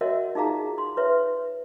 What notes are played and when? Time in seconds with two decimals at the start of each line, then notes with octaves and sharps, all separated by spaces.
0.01 F#4 A#4 C#5 D#5 E5 F#5
0.35 D#4 F4 G#4 F5 A#5
0.78 C6
0.97 B4 C#5 E5